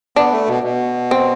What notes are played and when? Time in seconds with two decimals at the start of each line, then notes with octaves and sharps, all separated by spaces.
0.16 B3 D4
0.32 A3
0.48 B2
0.63 B2
1.11 C4